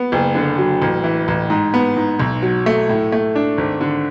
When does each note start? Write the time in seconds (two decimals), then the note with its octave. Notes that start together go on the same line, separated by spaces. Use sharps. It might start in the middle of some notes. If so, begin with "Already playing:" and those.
Already playing: B3
0.12 F#1
0.35 D3
0.58 F#3
0.82 A1
1.04 E3
1.28 A1
1.50 G#2
1.74 B3
1.96 G#2
2.19 B1
2.42 F#3
2.66 A3
2.89 A2
3.12 A3
3.36 D4
3.58 G#1
3.81 D3